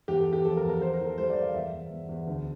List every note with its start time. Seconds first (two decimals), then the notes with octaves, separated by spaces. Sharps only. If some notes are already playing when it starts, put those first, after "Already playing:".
0.08 E2 G4
0.20 A4
0.27 E2
0.33 G4
0.45 F3 A4
0.57 A#4
0.63 E2
0.69 A#4
0.81 E2 C5
0.94 A#4
1.00 E3
1.06 A4
1.18 G3 C5
1.30 D5
1.36 E2
1.42 F5
1.54 E2 E5
1.72 E2
1.91 E2
2.09 E2
2.27 D2